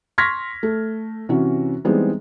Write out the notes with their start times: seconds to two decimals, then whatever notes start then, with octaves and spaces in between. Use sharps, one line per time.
0.18 C6 C#6 F6 G#6 A#6 B6
0.63 A3
1.29 C3 E3 C#4 F#4
1.85 E3 G3 G#3 B3 C4 D#4